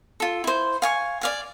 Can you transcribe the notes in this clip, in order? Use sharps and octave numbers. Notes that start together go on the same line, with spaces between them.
F4 A4
E4 C5
F5 G#5 C#6
D5 F5 G#5